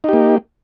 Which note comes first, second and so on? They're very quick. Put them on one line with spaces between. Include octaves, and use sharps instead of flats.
D#4 G4 A#3